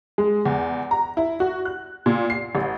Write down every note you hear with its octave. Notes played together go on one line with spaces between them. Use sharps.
G#3
E2
A#5
E4
F#4
F#6
A#2
C7
A1